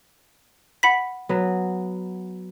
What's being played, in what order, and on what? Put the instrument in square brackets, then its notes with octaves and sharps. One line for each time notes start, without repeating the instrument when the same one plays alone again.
[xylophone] F#5 B5 B6
[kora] F#3 B3